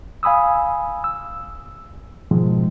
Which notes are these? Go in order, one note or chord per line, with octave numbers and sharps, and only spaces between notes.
F5 G#5 B5 D#6 E6
E6
G#2 B2 D#3 F3 G#3